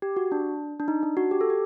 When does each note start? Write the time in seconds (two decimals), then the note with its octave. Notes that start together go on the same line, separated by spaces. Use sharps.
0.02 G4
0.17 F#4
0.32 D4
0.80 D4
0.88 D#4
1.03 D4
1.17 F#4
1.31 G4
1.41 A4
1.50 G4